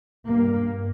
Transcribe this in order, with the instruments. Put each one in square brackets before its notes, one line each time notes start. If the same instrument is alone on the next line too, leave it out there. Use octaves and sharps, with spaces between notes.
[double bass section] G2 A#3